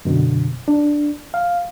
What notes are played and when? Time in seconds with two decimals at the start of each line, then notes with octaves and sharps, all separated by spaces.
0.05 F#2 B2 D3
0.68 D4
1.34 F5